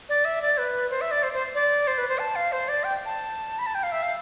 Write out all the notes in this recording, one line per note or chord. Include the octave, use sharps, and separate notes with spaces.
D5
E5
D5
B4
C5
E5
D5
C5
C5
D5
C5
B4
C5
A5
F5
C5
D5
G5
A5
B5
A5
G5
F5
E5
F5